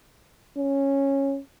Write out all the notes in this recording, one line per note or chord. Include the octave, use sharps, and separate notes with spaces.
C#4